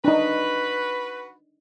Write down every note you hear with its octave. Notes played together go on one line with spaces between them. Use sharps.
D4 D#4 F#4 B4